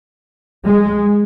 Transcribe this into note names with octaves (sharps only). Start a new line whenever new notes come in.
G#3